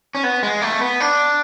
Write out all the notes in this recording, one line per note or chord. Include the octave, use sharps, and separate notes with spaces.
C#4
B3
G#3
A3
B3
D4